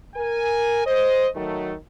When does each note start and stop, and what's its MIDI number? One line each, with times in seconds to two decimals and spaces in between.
0.15 0.82 70
0.15 0.82 80
0.86 1.28 72
0.86 1.28 75
1.35 1.74 51
1.35 1.74 54
1.35 1.74 57